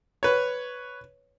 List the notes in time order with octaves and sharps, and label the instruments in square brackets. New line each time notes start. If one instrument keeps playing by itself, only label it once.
[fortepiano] B4 C#5